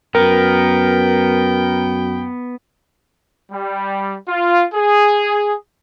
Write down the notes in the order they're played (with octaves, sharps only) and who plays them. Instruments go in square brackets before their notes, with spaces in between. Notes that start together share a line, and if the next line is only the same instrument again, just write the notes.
[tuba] F#2 [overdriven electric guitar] B3 [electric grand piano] A#4 [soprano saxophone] G5
[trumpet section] G3
F4
G#4